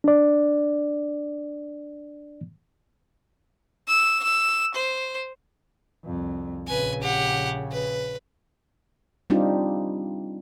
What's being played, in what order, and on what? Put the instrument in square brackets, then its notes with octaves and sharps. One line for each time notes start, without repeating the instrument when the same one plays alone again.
[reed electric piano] D4 D5
[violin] E6
E6
C5
[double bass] C2 F2
[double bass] A#1 C#3 [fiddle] B4 G#5
[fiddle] G4 F#5
B4
[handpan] G3 C4 D4 D#4 F4 G4